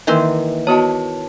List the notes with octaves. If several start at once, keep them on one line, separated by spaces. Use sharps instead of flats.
D#3 E3 A#3 A#4 E5 C6
B3 F#4 C#5 D#5 A5